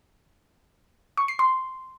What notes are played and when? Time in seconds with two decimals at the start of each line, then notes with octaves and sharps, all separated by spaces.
1.17 C#6
1.28 C7
1.39 C6